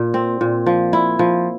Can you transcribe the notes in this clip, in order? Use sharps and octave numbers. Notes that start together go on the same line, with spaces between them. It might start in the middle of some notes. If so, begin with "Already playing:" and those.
Already playing: A#2
C4
A#2
F3
E4
F3